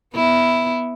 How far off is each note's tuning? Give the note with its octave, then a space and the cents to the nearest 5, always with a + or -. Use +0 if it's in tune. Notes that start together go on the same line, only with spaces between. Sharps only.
B3 +0 E4 +0